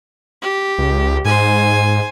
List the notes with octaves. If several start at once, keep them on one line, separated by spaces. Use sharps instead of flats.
G4
C#2
G#2 C5 G#5